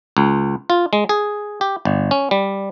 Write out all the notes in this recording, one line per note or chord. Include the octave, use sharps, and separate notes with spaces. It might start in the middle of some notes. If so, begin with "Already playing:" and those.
C#2
F4
G#3
G#4
G4
G1
C#4
G3